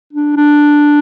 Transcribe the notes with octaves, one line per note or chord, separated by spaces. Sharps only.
D4
D4